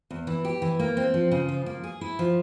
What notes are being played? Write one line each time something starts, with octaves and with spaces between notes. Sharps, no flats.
E2
E3
G4
E3
A#3
C4
F3
C#3
F3
A#3
G#4
E4
F3